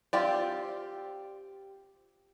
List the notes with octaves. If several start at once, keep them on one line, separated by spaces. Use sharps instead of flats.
C4 F4 G4 D5